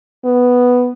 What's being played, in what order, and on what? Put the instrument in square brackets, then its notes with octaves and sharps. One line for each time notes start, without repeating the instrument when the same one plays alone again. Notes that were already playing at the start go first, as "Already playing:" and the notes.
[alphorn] B3